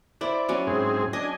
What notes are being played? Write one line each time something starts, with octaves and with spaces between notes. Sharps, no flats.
E4 C5 D5
F#3 C#4
G#2 C4 G#4
D4 D#5 G#5